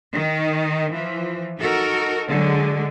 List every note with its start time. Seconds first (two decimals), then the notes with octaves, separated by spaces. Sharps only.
0.13 D#3 D#4
0.92 E3 F3
1.58 D#4 F#4 A4 A#4
2.29 D3 F#3 G#3